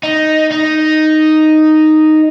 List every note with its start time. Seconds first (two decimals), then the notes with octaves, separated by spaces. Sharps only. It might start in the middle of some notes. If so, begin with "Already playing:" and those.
0.03 D#4
0.51 D#4